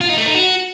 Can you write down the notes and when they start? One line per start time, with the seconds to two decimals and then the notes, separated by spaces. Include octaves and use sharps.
0.01 F4
0.09 D#4
0.18 A3
0.26 D#4
0.34 F#4